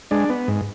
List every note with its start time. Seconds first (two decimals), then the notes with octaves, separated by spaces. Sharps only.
0.11 G#3 D4
0.30 B3
0.48 G#2